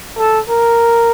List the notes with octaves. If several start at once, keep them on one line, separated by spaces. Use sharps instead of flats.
A4
A#4